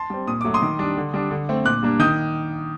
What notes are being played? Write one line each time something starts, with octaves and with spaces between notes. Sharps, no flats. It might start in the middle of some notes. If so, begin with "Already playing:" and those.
Already playing: A5 C6
G3 C4
A#2 D#6
F#3 A3 D6
C6 D#6
D#3
G3 D4
D3
G3 D4
D3
A3 C4
A#2 D6 F#6
G3 A#3 D4
D#3 D#6 G6